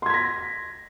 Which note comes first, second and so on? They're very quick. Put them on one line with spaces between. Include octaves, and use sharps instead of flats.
C6 G#6 B6 A#6